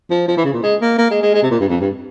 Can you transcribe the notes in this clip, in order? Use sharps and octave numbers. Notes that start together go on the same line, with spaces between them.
F3
F3
E3
C#3
A#2
G#3
A#3
A#3
G#3
G#3
G#3
C3
A#2
G2
F2
G2